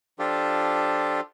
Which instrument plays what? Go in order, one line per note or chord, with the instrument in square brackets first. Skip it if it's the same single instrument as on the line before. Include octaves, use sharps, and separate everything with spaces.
[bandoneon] F3 D4 F4 G4 A4